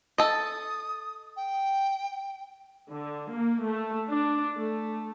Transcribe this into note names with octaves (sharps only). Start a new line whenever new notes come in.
A4 D#5 D#6
G5
D3
A#3
A3
D4
A3